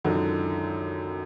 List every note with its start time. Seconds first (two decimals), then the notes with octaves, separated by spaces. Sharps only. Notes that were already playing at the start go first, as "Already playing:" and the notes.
0.04 C#2 F#2 D3 D#3